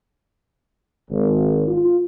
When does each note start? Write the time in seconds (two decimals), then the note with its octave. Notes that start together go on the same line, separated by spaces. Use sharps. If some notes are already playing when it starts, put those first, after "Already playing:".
1.10 G#1
1.68 F4